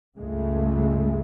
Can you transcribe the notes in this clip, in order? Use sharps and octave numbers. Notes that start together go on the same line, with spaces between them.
C#2 G2 C#3 G#3 A3